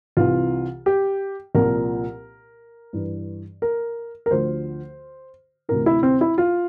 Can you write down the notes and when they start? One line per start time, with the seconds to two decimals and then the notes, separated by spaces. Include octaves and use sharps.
0.17 C2 C3 E3 F4
0.86 G4
1.55 C2 A#2 F3 A#4
2.93 G2 E3
3.62 A#4
4.26 A#4
4.31 D2 D3 F3 C5
5.69 D2 C3 E3 A#4
5.86 E4
6.03 C4
6.21 E4
6.38 F4